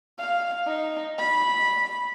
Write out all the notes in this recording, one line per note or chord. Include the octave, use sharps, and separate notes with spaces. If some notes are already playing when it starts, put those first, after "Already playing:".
F5
D#4
B5